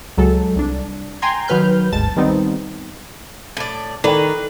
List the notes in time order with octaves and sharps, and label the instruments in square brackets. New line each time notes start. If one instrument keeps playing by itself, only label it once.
[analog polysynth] C#2 F#3 G#3 A4
C2 D4
G5 G#5 A#5 C6 G#6
D#3 F#3 B4 F6 G6
G1 D2 G#2 A5 A6
D#3 G3 B3 C4 D#4
[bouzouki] A2 D5
[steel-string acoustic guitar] D#3 [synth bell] A4 [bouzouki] B4 [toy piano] D5 G5